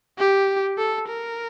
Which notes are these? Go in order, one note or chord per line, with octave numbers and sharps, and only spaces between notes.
G4
A4
A#4